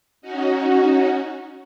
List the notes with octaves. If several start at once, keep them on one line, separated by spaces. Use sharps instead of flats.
C#4 D#4 F#4